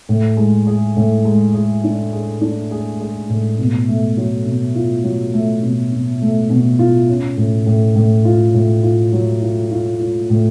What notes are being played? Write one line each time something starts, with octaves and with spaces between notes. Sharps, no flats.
A2
G#3
G#4
A2
G#3
G#4
D4
G#4
D4
G#4
G#4
A2
B2
A3
F#3
B2
F4
F#3
A3
B2
B2
A3
B2
F4
C#4
A2
A2
A2
F4
A2
F4
F#3
F4
F4
F4
A2